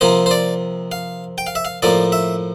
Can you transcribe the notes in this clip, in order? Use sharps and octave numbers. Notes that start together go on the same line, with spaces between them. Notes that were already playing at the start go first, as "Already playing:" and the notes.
C3 F3 A#3 C5
C5
D5
F5
G5
F5
E5
F5
A2 F3 A#3 D5
E5